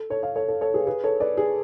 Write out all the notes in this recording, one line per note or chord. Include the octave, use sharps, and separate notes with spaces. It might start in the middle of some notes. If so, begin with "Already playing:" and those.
Already playing: A4
A4 C#5
C#5 F5
A4 C#5
A4
A4 C#5
G#4 B4
G#4 B4
A4 C#5
B4 D5
G#4